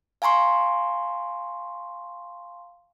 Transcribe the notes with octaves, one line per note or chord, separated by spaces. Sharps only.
F5 G#5 A#5 C6 C#6